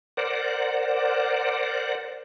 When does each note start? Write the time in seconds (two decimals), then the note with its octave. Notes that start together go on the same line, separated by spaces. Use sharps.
0.17 A#4 C5 D5 F#5